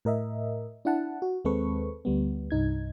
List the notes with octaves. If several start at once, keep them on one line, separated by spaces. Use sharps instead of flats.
A2 A#4 D#5 E5
D4 E4 F#5 A5
F#4
D#2 G#3 C4 A4 B4 C#6
D2 G3 B3
C2 G2 D#4 G#6